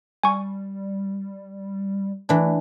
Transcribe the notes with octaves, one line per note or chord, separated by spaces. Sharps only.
G3 G#5 C#6
E3 A3 D4